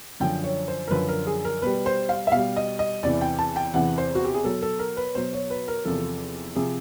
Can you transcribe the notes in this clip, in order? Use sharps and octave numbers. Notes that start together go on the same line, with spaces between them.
F#2 D3 F3 G5
C#5
C5
A#4
F#2 D3 F3 B4
A#4
G#4
A#4
B2 G3 B4
C5
F5
E5
B2 G3 F5
D#5
D#5
E2 C3 E3 D5
G5
A5
G5
E2 C3 E3 F#5
C5
F#4
G4
G#4
B2 F#3 A4
A4
A#4
B4
B2 F#3 C5
C#5
B4
A#4
E2 C3 F3 A4
C3 F3 G#4